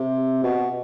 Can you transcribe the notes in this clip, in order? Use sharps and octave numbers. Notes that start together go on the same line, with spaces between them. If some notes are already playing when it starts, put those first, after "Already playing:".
Already playing: C3
B2